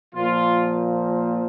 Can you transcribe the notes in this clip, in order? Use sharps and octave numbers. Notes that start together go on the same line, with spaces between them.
A#2 F3 F4